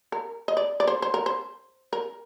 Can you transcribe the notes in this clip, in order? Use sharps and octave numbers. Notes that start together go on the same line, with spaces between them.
A#4
D#5
D5
D5
C5
C5
A#4
C5
A#4